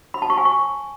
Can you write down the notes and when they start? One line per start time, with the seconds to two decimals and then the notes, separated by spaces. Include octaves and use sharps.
0.14 B5
0.22 A5
0.30 C#6
0.38 G#5
0.45 C#6